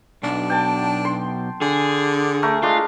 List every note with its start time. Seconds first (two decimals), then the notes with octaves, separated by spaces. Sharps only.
0.23 B1 D4
0.50 G5 A5
1.05 C6
1.61 D3 G#4
2.43 A3 A#4 C#6
2.63 G#3 D4 F4